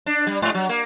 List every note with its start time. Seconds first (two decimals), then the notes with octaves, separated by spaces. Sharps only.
0.06 D4
0.27 G3
0.42 G#2
0.55 F#3
0.69 A#3